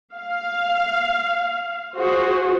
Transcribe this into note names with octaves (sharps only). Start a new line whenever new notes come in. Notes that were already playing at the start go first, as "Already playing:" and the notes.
F5
F4 F#4 G#4 C5